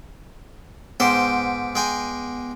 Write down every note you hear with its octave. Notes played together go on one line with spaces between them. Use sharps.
G#2 B3 C5 G5 D6 D7
G#3 G5 G#5